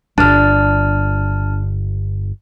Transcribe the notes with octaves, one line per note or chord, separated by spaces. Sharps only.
D1 G1 D4 A5 F6